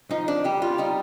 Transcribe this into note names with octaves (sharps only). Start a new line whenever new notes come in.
F3 D#4
D4
G3 G4
F4
G3 D#4